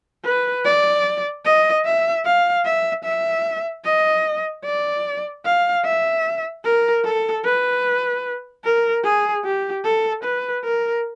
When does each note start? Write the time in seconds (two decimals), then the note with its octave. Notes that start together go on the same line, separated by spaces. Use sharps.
0.25 B4
0.65 D5
1.45 D#5
1.85 E5
2.25 F5
2.65 E5
3.04 E5
3.84 D#5
4.64 D5
5.45 F5
5.85 E5
6.65 A#4
7.04 A4
7.45 B4
8.64 A#4
9.04 G#4
9.44 G4
9.84 A4
10.24 B4
10.64 A#4